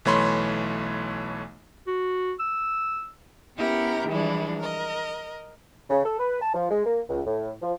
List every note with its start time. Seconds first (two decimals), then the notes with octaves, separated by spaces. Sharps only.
0.05 B1 E3 A3 C#5 B5 C6
1.87 F#4
2.40 E6
3.57 B3 C#4 E4 G4 A#4 A#5
4.07 E3 F3 G3 G#3 D4 E4
4.58 A#4 D#5
5.90 C#3
6.05 A4
6.19 B4
6.42 A5
6.54 F3
6.70 G#3
6.85 A#3
7.09 C#2
7.26 A2
7.62 F3